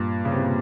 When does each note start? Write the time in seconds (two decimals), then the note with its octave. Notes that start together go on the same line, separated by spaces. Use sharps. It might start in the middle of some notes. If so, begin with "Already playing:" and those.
Already playing: G2 A#2
0.25 C#3
0.32 C3
0.40 A#2